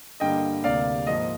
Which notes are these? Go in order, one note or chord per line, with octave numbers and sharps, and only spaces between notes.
G2 D3 G3 A#3 D#5 G5
D2 C3 G3 A#3 D5 F5
G#2 F3 A#3 D#5